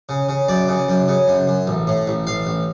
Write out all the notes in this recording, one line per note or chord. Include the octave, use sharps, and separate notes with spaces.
C#3
C#3
F#2 D5
C#3
F#2
C#3
F#2
F#2
A1
A2
A1
A1 F5
A1